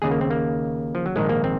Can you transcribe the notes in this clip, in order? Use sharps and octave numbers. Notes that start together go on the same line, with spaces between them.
D#2 C#3 G#4
A#3
C4
A#3
F3
F#3
A#1 G#2 D#3 G#3
A#3
C4